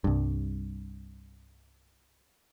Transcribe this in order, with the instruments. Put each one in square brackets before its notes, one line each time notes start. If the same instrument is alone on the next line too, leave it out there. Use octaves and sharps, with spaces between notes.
[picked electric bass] C2 G2